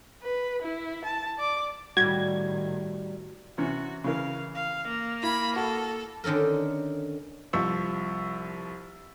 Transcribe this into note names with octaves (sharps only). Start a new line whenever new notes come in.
B4
E4
A5
D5 D6
A2 D#3 G3 F#4 G#6
C3 E3 C#4 F#4
C#3 E3 A#4 F5
F5
A#3
E4 B5
F#4 A4
D3 D#3 C#4 A4 A#4
C2 F3 C#6 E6